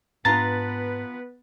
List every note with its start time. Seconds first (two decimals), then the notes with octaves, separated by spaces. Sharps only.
0.25 G#2 B3 D4 F4 B4 A5 A#5 A6